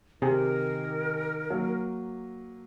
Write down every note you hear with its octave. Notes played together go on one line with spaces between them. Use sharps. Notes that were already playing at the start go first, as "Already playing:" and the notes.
C3 D#3 G4 G#4 A#4
F#3 A#3